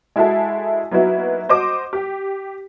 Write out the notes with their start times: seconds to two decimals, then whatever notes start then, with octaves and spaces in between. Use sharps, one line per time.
0.16 G#3 E4 F#4 G#4 A4
0.91 F#3 A#3 B3 D#4 E4 F#4
1.49 F#4 C5 D#5 D6
1.93 G4